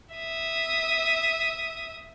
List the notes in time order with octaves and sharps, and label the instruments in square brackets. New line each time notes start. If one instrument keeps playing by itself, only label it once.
[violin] E5 D#6